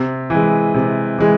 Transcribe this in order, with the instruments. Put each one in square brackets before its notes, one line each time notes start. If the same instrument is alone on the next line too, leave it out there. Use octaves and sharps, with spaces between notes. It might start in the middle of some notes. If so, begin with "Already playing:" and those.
Already playing: [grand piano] C3
E3 G#3
C3
E3 G#3